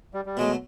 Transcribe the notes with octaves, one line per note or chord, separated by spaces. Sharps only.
G3
G3
B2 F#3 G#3 A3